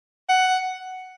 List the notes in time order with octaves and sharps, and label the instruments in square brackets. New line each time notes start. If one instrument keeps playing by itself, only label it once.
[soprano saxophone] F#5